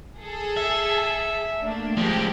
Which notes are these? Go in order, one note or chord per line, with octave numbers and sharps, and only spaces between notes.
G#4 A4
E5
A3 A#3 D4
F3 G#3 G4